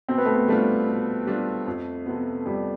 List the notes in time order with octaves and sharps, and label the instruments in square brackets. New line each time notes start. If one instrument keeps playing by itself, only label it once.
[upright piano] B2 [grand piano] C4
[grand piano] B3
A3
B3
[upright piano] G3 D4 F4 [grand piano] A3
[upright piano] B2
G3 D4 F4
F2
C3 F3 B3
[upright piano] F2 [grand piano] G3